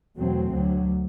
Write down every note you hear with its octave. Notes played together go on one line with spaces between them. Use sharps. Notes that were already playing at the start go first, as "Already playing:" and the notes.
E2 B2 F#3 A3 C4
D2 D3 F#3